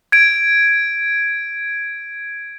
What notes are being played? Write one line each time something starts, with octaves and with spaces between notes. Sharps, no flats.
G#6 D7